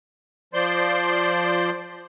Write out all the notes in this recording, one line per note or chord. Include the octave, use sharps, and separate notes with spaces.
F3 C5 D5 C6